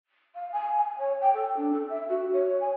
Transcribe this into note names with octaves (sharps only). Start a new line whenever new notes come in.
F5
G#5
G#5
C#5
G5
A4
D4
A4
E5
F#4
C#5
G#5